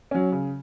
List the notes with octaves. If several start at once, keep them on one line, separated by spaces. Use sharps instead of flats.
F#3 C#4
C#3